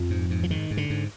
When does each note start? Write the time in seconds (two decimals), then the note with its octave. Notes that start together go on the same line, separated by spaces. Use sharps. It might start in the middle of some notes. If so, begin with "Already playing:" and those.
Already playing: F2 F3
0.10 G#2
0.30 G#2
0.43 F3
0.50 G#2 D#3
0.71 G#2
0.77 D3
0.90 G#2